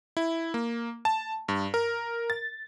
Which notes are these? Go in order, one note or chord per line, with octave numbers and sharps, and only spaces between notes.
E4
A#3
A5
G2
A#4
A6